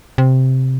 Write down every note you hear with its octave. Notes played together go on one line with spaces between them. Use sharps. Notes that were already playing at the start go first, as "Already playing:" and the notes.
C3